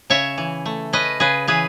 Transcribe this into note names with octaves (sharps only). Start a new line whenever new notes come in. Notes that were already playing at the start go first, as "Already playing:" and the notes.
C#3 C#5 E5
E3
A3
C#4 B4 D#5
C#3 G#4 B4
E3 G#4 B4